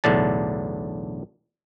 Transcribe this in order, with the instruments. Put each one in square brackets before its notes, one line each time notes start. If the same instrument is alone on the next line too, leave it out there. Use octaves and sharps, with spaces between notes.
[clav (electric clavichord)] B1 E2 A2 D3 D4 A5